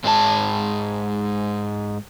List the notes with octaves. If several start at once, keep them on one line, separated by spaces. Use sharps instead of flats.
G#2 G#3 G4 A5